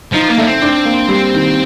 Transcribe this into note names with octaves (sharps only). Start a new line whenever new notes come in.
F3 D#4
A#3
A3 D4
C4
D4
A#3
G3
D#3